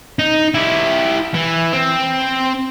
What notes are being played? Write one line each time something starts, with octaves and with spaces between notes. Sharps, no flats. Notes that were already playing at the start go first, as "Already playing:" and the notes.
D#4
E4 G4
E3
C4